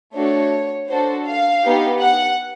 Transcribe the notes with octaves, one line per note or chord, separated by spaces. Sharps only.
A3 D4 F#4 A4 C#5
D4 F#4 A4 C5
F5
B3 D#4 G4
F#5